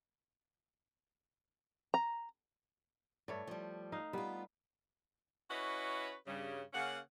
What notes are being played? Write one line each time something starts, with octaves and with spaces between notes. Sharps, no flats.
A#5
G2 A3 C#5 D5
F3 G3
D#4 F5
G3 B3 F4
C#4 E4 F#4 B4 C#5 D#5
G2 C#3 G3
C#3 A#3 C#4 F#5